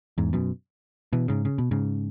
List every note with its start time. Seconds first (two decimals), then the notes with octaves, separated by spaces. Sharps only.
0.18 E2 G#2
0.33 F#2 B2
1.13 B2 E3
1.28 G#2 C#3
1.45 C#3
1.58 B2
1.71 G#2 C#3